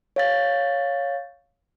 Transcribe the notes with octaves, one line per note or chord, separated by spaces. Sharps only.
C#5 F5 A6